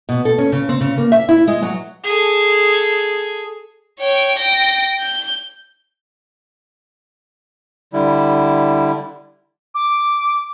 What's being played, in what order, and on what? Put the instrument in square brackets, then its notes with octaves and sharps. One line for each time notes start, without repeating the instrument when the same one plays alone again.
[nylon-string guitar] B2
A4
C#4
C#3
C4
C#3
A#3
E5
E4
G#3
F#3
[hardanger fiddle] G#4 A4
[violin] C#5 G5
G5 A#6
G6
[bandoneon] D3 G3 E4
[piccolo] D6